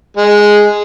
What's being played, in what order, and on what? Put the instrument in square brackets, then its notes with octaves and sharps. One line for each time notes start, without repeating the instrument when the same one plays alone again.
[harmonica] G#3